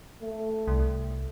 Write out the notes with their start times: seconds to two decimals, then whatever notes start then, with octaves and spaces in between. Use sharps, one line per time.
0.22 A3
0.68 C2